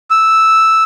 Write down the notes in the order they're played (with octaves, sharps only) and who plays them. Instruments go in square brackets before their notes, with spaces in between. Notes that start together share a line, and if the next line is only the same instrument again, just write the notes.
[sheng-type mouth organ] E6